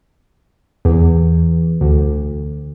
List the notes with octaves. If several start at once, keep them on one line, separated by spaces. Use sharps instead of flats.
E2
D2